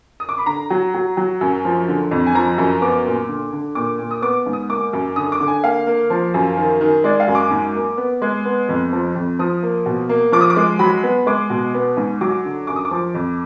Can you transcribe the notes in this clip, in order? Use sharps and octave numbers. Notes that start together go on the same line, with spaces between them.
D#6
D6
B5
D3 A#5
F#3
F#3
F#3
F#2
F3
D3
F2
G#5
F3 A#5
F#2
B3 D6
A#2
D3
D3
A#2 D6
A#2
D#6
B3 D6
G#2
D#6
A#3 D6
F#2
D3 D#6
D6
D3
G#5
A#3 F5
A#3
F3
F#2
D#3
D#3
G#3 D5
F5
F#2
D6
G#2
A#3
B3
G#3
B3
F2
F3
F2
F3 D#6
A#3
B2
A#3
F3 D6
D#6
D6
G#3
F#3 B5
B3
G#3 D6
B2
B3
G#2
F#3 D6
D3
F#2 D6
D#6
D6
F3
F2